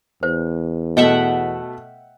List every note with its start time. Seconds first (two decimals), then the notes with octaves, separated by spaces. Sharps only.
0.23 E2 C5
0.97 B2 A3 D#5 E5 F#5 G5